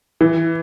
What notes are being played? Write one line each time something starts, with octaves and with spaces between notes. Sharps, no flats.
E3